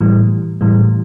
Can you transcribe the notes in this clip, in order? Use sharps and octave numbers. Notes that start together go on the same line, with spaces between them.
A2 E3 G3
A2 E3 G3